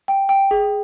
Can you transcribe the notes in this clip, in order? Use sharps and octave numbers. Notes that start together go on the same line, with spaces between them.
G5
G5
G#4